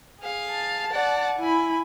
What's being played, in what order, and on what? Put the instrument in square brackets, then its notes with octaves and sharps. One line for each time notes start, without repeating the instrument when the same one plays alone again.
[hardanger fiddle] G#4 F5
[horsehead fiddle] A5
[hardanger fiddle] D5 F#5
[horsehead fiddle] E4 B5 [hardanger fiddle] G#5